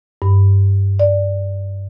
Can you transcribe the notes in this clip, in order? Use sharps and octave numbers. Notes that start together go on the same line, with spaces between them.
G2
D5